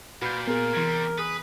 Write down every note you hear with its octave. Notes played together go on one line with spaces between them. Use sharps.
A#2 F#4 B4 F6 G6
B3 G#4 A#4
C3 E3 G3 G#6
G#4 B4 F#6 B6